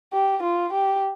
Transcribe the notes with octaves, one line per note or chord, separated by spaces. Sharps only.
G4
F4
G4